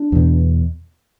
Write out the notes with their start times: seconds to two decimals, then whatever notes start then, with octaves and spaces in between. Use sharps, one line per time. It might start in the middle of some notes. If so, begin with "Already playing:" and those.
Already playing: D4
0.12 E2 B2